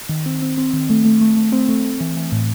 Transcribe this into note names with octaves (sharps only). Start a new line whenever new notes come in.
D#3
C4
C4
C4
D#3
A3
A3
A3
A3
C4
A3
A3
E3
E3
A2